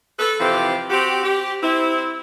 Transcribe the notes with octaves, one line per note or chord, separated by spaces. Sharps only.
A4 B4
C3 E3 F3 C4 G4
C4 F#4 G4
G4
C4 E4